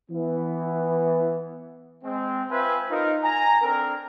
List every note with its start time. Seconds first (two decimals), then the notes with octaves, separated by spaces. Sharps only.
0.11 E3 B3
2.04 G#3 C4
2.51 C4 F4 B4 C5 E5 G#5
2.90 D#4 F4 A#4
3.23 G#5 A#5
3.62 C4 D4 A4 A#4